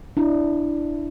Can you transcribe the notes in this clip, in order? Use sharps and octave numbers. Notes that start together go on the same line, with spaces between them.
D4 E4